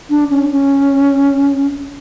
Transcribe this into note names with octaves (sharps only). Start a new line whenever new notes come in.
D4
C#4
C#4